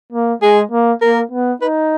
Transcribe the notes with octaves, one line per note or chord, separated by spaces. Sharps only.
A#3
G#3 G#4
A#3
A#3 A#4
B3
D#4 B4